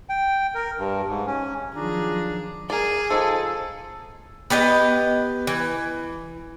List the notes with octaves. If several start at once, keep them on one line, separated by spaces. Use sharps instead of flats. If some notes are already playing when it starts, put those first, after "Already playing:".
G5
A#4
G2
G#2
C#4
D#3 F3 F#3 D4 F4 G#4 A#5
G#4 A#4 D5
F3 D#4 A4
B3 G4 B4 D#5
E3